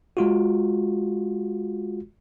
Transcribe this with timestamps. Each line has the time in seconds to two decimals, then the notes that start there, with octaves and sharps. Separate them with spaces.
0.17 G#3 F4 F#4